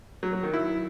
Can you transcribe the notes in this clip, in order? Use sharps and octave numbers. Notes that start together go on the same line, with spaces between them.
F#3
F#3
D#3
E4